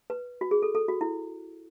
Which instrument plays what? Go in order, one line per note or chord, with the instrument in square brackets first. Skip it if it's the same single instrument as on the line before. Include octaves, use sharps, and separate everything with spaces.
[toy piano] B4
F#4
G#4
A4
A4
F#4
E4